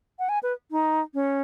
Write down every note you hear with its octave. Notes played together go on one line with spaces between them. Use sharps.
F#5
G#5
B4
D#4
C#4